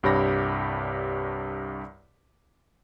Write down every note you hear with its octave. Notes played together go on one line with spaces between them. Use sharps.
C2 G2 G4 C#5 B5 A#6